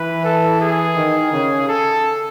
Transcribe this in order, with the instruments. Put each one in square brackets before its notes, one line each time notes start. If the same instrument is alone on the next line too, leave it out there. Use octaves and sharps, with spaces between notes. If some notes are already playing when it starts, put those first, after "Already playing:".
Already playing: [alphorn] E3 [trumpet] B4
[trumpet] A4
G#4
[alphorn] D#3
C#3
[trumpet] A4